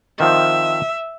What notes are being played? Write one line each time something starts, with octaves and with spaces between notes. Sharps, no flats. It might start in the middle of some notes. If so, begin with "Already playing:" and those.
D#3 F3 C4 E5